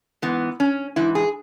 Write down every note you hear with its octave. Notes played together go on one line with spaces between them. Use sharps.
G#2 E3 B3
C#4
G#2 E3 E4
G#4